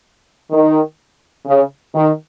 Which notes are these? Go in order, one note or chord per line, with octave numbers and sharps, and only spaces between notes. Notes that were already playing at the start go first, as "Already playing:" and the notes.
D#3
C#3
D#3